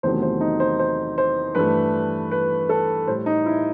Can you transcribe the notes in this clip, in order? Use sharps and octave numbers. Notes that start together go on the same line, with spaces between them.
E2 C3 D#3 F#3 A3 C5
C5
D#4
C5
C5
C5
G2 E3 A3 B4
B4
A4
A2 G3 C5
D#4
E4